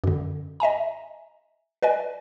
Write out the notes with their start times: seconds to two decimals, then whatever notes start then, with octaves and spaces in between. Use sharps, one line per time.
0.04 F#2 D3
0.60 D#5 E5 G#5 A#5
1.82 B4 D5 D#5 G#5